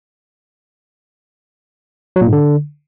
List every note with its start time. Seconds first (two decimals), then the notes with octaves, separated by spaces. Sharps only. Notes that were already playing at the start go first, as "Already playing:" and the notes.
2.16 F#3
2.21 A#2
2.27 G#2
2.32 D3